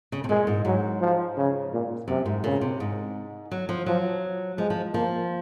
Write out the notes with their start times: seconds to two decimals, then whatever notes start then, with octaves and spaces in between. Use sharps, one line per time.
0.12 C#3
0.24 C3
0.29 A#2 G#3
0.47 G#2
0.65 G#2 F#3
1.01 F3
1.37 C#3
1.73 A#2
2.08 F#2 C3
2.26 G#2
2.44 A#2 C#3
2.61 C3
2.80 G#2
3.51 F#3
3.69 F3
3.86 F3 F#3
4.58 F3 G#3
4.70 F3
4.94 F3 A#3